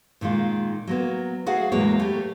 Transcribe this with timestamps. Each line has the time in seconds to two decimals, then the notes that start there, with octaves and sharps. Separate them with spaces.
0.21 A#2 D#3 G#3 F4
0.87 F#3 A#3 B3
1.46 A3 F#4 G#4 F5 F#5
1.72 E2 A2 F#3 G#3 A#3 C#5
1.99 A3 G4